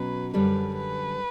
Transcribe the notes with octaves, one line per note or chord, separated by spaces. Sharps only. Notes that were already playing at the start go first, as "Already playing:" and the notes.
Already playing: B2 F#3 C#4 B4
F#2 D3 G3 B4
B4